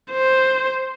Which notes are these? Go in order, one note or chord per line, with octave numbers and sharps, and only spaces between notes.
C5